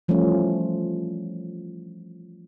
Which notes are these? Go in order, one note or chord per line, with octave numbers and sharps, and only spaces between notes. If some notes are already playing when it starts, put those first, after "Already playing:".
E3 F3 G3 A3 C#4 F4